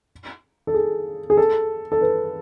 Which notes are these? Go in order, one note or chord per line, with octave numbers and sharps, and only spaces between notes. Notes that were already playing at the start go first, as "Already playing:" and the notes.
A4
G#4
G#4
A4
A4
B4